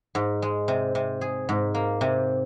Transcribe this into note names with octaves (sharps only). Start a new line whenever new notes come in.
G#2
G#3
C3
C3
G#4
G#2
A#3
C3